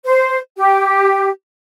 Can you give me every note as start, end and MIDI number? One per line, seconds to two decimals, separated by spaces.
0.04 0.38 72
0.57 1.30 67